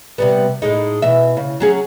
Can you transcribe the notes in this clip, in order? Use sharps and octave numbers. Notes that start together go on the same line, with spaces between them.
C3 G3 B3
A2 G#3 D#4
B2 E3 E5
C#3
F#3 C#4 G#4